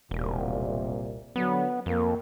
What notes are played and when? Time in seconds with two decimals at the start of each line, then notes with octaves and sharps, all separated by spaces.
0.11 E1 C2 A#2
1.36 D3 F#3 B3
1.86 F2 A#3